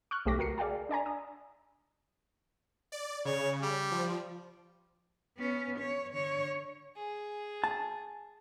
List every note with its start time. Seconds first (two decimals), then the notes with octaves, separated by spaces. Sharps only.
0.11 C#6 F6 F#6
0.26 B1 A3 G4 D6 A#6
0.38 C#2 F#4 A#4 C7 C#7
0.58 G#4 D5 F5 G5 A5
0.89 D4 D5 G#5 A#5
1.06 D#6
2.92 D5
3.25 C#3 C#5
3.61 G3
3.91 F3
5.37 B3 C#4
5.79 C#5
6.12 D3 C#5
6.96 G#4
7.64 A5